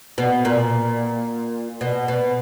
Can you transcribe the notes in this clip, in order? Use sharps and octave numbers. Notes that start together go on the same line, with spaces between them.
B2
A#2
B2
B2